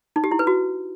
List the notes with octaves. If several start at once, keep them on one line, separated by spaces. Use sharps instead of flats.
D#4
G4
E4
B4
F#4